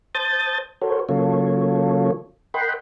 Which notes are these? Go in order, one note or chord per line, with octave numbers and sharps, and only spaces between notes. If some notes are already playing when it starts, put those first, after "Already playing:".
C5 A5 D#6 G6 A6
F#4 A4 A#4 C5 C#5
C#3 F#3 A#3 F4 A4 C#5
A#4 D#5 F#5 G5 B5 C6